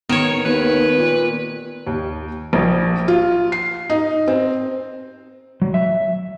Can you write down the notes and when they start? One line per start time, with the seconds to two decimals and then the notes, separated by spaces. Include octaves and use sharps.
0.09 D#3 B3 C#5
0.45 D#2 B4
0.97 A#2
1.87 D#2
2.53 A#1
3.08 F4
3.52 C7
3.90 D#4
4.28 C4
5.62 F#3
5.74 E5